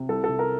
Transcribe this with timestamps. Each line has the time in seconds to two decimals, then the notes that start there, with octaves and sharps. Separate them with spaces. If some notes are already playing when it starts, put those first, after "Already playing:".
Already playing: C3
0.09 C2 A4
0.24 A4
0.29 C3
0.39 A#4